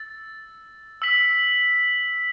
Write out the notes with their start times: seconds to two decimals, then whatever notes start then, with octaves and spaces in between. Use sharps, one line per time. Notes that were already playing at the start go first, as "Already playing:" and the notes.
Already playing: E6 A6
1.02 E6 B6 F#7